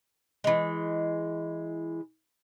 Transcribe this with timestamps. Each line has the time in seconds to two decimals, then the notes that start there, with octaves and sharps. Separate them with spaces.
0.44 E3 G#3